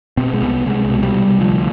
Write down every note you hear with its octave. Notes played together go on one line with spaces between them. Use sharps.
B2 C4
G#3
C2 B3
C2 G#3
B2
G3
C2
D2 F3